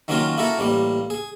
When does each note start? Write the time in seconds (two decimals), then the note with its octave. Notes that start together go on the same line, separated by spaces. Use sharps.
0.08 D#3 F#3 A#3 C#4 F4 F#4
0.37 A#3 E4 F#4 A4 A#4
0.59 A1 G3 A#3
1.10 G#4